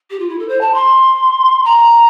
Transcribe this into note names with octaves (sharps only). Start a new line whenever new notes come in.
G4
F4
E4
A4
C5
A5
C6
A#5